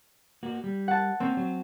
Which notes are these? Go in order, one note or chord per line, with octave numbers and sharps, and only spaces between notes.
A#3 F#4
G3
F#5 A5
A#3 C4 C#4
F#3